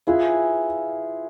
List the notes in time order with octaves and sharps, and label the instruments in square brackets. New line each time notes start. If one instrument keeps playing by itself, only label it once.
[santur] E4 G#4 B4 E5 [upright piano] F4